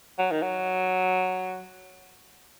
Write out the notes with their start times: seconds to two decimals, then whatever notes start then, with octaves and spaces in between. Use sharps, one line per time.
0.19 F#3
0.31 D#3
0.42 F#3